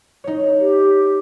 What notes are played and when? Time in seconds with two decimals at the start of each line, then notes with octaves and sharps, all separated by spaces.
0.24 D#4 C#5
0.59 G4